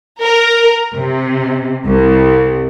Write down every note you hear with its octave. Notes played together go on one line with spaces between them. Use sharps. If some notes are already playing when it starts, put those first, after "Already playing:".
A#4
C3
C2